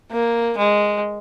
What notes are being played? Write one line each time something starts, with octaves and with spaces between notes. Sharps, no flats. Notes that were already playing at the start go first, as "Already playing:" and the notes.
A#3
G#3